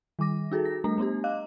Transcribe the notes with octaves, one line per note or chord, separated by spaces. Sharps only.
D#3 G3 D6 A#6
D#4 F#4 G#4 A4
A#6
G3 A3 D4 A#5
A3 B3 D4 G4
D#5 F5 D6 F#6